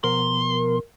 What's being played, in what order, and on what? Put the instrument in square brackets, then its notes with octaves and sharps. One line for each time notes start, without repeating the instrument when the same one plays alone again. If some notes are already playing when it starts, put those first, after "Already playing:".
[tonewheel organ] B2 F3 B3 [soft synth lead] A#4 [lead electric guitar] C6